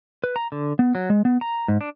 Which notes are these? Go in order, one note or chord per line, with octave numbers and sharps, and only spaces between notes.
B4
A#5
D3
B3
F#3
G#3
B3
A#5
G#2
D4